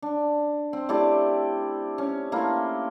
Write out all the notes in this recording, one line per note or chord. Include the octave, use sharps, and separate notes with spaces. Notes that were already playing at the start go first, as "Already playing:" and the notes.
D4
C4
A3 E4 G4 D5
C#4
A3 A#3 E4 F4